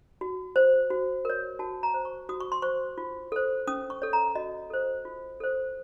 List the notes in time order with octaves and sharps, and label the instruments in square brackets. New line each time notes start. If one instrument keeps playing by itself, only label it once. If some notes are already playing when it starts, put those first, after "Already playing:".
[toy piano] F#4
C5
F#4
A#4 C#5
F#4 A5
A#5
C5
C#6
F#4 D#6
C#6
C6
C5 C#6
F4
A4 C5
C#4 D#6
C#6
A4 C#5
A#5
F#4 D#5
A4 C5
F4
A4 C5